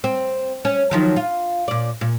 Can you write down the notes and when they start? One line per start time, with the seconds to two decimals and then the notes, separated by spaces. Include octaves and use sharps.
0.04 C4
0.65 C#4
0.91 D#3 F3 F#3
1.16 F4
1.68 A#2 D5
2.01 A#2